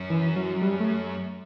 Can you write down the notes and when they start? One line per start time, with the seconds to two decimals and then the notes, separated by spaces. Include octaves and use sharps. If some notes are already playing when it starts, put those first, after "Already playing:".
Already playing: F#2
0.10 E3
0.36 F#3
0.62 G3
0.80 A3